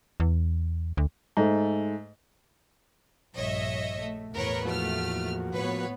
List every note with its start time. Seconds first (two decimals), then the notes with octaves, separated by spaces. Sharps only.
0.20 E2
0.97 D2
1.37 G#2 A3
3.35 A#1 G2 C#5 D#5 E5
3.99 A3
4.33 E2 A2 A#4 B4 C#5
4.65 F3 A3 A#3 F#4 F6
5.54 A2 B3 B4 C#5